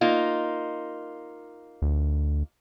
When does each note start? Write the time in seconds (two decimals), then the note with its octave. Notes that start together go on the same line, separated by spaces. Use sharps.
0.01 A#3 D#4 F4
1.82 D2